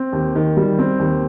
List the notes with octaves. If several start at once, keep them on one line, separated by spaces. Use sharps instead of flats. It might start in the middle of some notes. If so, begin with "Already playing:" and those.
Already playing: C4
D#2
D#3
G3
C4
D#2